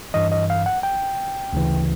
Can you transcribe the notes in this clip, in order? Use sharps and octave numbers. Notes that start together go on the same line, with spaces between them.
G2 E3 D#5
D#5
F5
F#5
G5
D2 C#3 E3